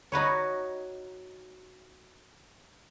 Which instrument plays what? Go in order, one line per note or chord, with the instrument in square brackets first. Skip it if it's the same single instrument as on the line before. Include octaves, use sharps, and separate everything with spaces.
[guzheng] D#4 F#4 B4 C#5